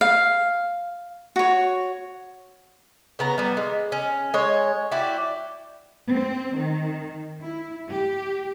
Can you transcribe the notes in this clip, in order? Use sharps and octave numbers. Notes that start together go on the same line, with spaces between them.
F5
F#4 C#5
C#3 B3 A#5
G3 B3
G#3
C#4
G#3 C#5
E4 F#4 G4 D5
C4
D#3
E4
G4